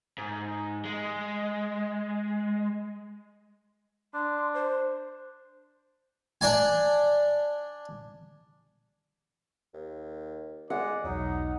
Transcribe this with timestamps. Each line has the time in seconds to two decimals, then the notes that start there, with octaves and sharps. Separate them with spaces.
0.18 G#2
0.85 G#3
4.14 D4 C6
4.54 C5
6.41 D4 D5 G#5
9.74 D#2
10.70 G#3 D5 F#5
11.04 B1 E2 F#3 D#4